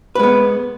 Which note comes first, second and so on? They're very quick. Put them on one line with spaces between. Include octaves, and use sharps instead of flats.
B4 G#3 B3